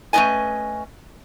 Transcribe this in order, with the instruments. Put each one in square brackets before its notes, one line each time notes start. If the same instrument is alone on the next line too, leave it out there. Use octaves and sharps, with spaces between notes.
[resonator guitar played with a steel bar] A3 C#4 D4 B4 D#5 G#5